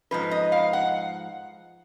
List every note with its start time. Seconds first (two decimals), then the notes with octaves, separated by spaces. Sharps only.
0.11 G#2 F3 B4
0.31 D#5
0.52 F5
0.73 F#5